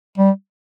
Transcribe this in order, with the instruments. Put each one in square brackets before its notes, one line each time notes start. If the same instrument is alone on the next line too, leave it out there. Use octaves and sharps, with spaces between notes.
[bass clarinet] G3